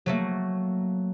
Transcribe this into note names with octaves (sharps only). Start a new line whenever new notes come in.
F#3 A3 A#3